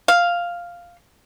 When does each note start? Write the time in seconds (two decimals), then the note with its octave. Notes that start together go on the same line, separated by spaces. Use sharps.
0.08 F5